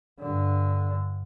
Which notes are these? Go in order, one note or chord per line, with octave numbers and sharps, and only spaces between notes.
G2 D3